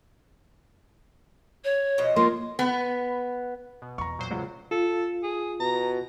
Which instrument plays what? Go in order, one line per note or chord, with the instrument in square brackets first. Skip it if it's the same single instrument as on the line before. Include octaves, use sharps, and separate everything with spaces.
[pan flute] C#5
[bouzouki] B2 F3 D#5
[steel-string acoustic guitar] A#3 [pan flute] F4 [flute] C6
[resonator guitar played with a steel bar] B3
[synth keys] B2
[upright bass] E2 [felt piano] A#5 C#6
[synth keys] A#2 F#3 C5
[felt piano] C#2 [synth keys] F#3
[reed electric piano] F4 [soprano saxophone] A4
[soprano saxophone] G#4
[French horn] B2 [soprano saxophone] A#5